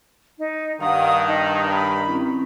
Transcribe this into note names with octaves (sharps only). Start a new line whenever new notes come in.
D#4
G2 D#3 F5 F#5 D#6
D#4 A5 A#5
B5
C4 C#4 E4